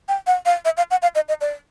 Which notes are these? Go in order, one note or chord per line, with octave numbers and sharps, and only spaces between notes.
G5
F#5
F5
E5
F5
F#5
F5
D#5
D#5
D5